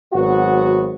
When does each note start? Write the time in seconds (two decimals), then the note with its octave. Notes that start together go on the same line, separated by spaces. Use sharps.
0.13 G#1 F#3 B3 F#4